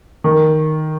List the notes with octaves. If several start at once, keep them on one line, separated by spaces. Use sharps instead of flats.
D#3